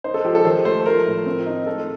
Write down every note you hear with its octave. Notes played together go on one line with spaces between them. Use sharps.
D#4 C5
A4
F3 G4
A4
D#3 C5
A3 C5
F3 A#4
A2
C4
D#4
A3 A4